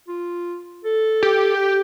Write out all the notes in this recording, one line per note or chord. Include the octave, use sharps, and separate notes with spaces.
F4
A4
G4
G5